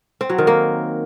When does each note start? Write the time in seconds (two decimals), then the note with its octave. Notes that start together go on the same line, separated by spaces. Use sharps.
0.21 C4
0.30 F#3
0.38 D#3
0.47 A#3